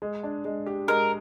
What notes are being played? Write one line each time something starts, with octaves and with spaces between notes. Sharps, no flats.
G#3
D4
G#3
G4
G#3 A#4